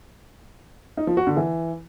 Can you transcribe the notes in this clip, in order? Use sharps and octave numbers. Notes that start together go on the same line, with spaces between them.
D#4
F3
F#4
D3
E3